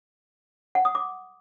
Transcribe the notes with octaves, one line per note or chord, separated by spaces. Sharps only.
F#5
D#6
D6